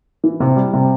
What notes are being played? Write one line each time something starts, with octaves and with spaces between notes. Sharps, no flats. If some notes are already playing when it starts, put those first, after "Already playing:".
E3
C3
G3
C3